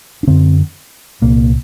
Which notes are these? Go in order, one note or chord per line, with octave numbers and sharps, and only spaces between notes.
D4
F#2 D3 C4
C2 A#2 A#3